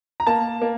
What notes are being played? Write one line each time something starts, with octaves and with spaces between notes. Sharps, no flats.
A#5
A#3 A5
A#3